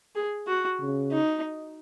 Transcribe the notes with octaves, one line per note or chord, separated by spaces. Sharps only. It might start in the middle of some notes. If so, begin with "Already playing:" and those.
G#4
F#4
C#3
D#4